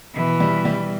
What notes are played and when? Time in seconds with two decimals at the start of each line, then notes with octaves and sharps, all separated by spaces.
0.15 B2 E3
0.40 G3
0.65 G3